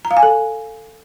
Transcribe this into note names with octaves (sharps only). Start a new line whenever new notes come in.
A#5
F5
G#5
A4